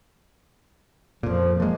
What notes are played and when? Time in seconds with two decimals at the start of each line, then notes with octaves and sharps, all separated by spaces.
1.23 F2 A#2 F3
1.60 F3 G#3 A#3